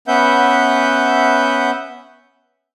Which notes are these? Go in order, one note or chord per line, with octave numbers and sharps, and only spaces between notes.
B3 C#4 B4 E5 F#5 G6